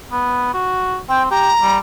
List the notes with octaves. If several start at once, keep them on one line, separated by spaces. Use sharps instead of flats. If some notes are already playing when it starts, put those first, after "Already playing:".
B3
F#4
C4 G5
G4 A#5
G3